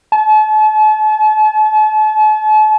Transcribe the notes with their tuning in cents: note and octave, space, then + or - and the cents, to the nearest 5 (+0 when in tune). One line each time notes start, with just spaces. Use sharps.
A5 -40